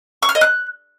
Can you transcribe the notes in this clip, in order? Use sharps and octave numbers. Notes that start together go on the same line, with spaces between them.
C#6
F6
D#5
F#6